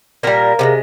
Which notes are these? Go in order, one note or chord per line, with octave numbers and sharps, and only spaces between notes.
A#2 G3 A#3 A#4
C3 D#3 G#3